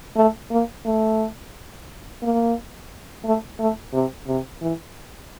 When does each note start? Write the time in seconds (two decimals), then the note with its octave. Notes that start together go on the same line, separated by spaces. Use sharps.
0.16 A3
0.51 A#3
0.85 A3
2.22 A#3
3.24 A3
3.59 A3
3.93 C3
4.27 C3
4.61 E3